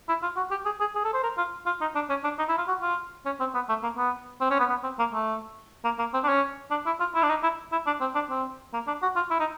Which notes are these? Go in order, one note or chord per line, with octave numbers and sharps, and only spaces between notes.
E4
F4
F#4
G4
G#4
G#4
G#4
A4
C5
A#4
F4
F4
D#4
D4
C#4
D4
D#4
E4
F4
F#4
F4
C#4
C4
B3
A3
A#3
B3
C4
C#4
B3
B3
C4
A#3
A3
A#3
A#3
C4
D4
C#4
D4
E4
F4
E4
D4
D#4
E4
E4
D4
C4
D4
C4
A#3
D4
F#4
F4
E4
D#4